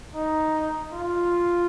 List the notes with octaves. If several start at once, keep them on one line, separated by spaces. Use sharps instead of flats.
D#4
F4